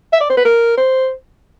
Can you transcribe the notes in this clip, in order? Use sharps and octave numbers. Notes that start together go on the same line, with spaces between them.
E5
D5
C5
B4
A#4
C5